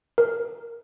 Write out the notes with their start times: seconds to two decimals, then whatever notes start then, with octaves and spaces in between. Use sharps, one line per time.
0.18 A#4